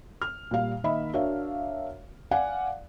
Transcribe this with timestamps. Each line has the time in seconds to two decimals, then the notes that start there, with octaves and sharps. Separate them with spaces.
0.22 F6
0.51 A#2 G3 F5
0.84 D#3 A#3 D#5 E5 B5
1.13 D4 F#4 A#4 C#5 E5 F5
2.31 D5 F5 F#5 G#5